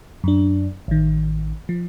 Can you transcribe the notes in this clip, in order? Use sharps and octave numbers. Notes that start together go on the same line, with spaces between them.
F#2 D4
A1 D#3
F3